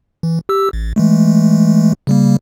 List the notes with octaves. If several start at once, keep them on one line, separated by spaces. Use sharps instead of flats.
E3
G4 E6
A1
E3 G#3 A3
C#3 G3 A#3